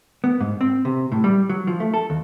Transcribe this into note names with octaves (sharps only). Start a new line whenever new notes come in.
B3
G#2
C4
C3
A2
G3
F#3
F3
A3
A4
D#2